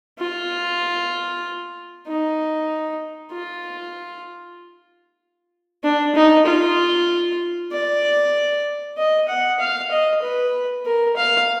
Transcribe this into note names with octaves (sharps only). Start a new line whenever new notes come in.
F4
D#4
F4
D4
D#4
F4
D5
D#5
F#5
F5
D#5
B4
A#4
F5